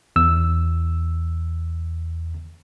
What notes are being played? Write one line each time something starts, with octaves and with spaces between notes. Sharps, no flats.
E2 E6